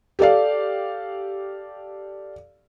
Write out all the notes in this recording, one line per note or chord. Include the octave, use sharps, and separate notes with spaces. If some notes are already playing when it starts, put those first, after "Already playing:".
G4 A4 D5 F5